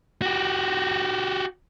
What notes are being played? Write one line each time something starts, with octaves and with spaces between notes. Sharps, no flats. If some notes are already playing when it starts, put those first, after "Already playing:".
F#4 G4